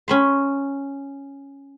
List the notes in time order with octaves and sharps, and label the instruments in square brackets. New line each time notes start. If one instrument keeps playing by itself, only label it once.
[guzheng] C#4 B5 C6